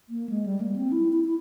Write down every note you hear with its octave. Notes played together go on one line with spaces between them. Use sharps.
A#3
G#3
G3
A#3
C4
E4
E4
E4